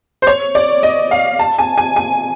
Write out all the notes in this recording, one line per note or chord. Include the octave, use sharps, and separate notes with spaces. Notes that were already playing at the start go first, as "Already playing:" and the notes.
C5
C#5
D5
D#5
F5
A5
G#5
G#5
G#5